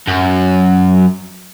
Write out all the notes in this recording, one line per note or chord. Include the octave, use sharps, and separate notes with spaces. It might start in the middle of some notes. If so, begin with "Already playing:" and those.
F#2